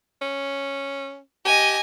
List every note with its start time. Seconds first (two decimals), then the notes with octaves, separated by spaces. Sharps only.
0.21 C#4
1.45 G4 D#5 G#5